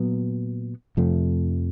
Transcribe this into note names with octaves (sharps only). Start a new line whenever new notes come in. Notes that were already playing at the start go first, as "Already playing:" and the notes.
Already playing: A#2 F#3 B3
F2 C3 F3 A3